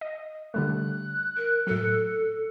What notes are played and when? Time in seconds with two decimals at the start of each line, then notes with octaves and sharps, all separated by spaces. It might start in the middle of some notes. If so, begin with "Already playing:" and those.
0.01 D#5
0.54 D3 G3 A3 F#6
1.37 A#4
1.67 A2 F#3 A4